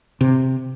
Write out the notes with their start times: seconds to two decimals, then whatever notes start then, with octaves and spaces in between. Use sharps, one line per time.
0.21 C3